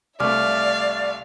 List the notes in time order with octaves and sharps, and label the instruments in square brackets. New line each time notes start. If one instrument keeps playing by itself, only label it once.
[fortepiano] C2 A3 [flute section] D5 [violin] E5 F5 [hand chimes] D6 F6